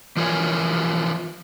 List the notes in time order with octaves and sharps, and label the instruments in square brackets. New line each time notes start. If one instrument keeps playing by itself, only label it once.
[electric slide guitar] E3 F3 F4 A#4 C#5 G#5